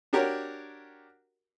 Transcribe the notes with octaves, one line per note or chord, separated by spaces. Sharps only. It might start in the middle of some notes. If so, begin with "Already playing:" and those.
D4 F#4 G4 A#4 C#5